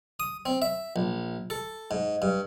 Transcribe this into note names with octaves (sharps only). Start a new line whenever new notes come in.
D#6
C4
E5
A#1
A4
G#2
G2